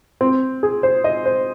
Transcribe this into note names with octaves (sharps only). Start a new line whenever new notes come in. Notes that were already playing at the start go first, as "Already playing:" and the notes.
C4
G#4
C5
D#5
C5